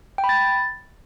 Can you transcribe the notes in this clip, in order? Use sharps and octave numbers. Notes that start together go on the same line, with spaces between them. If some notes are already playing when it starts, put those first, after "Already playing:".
G5
B5
A6